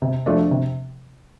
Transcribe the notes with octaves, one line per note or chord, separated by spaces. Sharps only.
C3
F3 A3 D4
C3